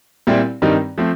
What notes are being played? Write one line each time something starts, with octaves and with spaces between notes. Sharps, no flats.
A#2 G3 C4 E4 G4
G2 D#3 G3 C4 D#4
F3 A3 C4